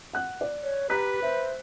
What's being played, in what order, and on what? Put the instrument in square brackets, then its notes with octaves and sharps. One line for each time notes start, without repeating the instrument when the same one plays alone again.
[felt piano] F#5 F#6
D5
[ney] C#5
[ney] G4 [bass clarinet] B4 [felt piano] A#5 F#6 B6
[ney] C5 [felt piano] E5